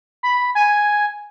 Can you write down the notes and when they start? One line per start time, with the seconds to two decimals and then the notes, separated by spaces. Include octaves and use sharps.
0.23 B5
0.55 G#5